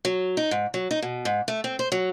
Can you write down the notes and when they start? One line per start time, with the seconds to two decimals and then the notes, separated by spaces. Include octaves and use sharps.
0.05 F#3
0.37 D#4
0.51 G#2
0.74 F#3
0.91 D#4
1.02 B2
1.25 G#2
1.48 A3
1.64 C4
1.79 C5
1.92 F#3